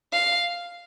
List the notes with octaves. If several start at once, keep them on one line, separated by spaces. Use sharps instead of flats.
F5